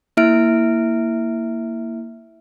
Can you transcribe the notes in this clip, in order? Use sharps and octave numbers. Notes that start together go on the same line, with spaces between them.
A#3 E4 E5 F6 D7